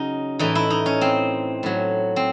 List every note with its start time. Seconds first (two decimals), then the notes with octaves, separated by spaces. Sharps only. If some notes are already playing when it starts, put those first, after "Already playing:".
Already playing: C#3 F#3 C#4 D#4
0.39 A2 E3 D#4
0.55 E4
0.70 D#4
0.86 C#4
1.01 C4
1.63 A2 F#3
2.16 C4